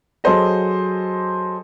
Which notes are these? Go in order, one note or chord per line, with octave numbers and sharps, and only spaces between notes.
F#3 G#4 A4 C5 D#5